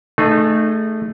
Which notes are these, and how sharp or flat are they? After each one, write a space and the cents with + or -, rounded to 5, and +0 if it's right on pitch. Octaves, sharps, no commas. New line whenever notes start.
A3 +0 D#4 -30 G#4 +0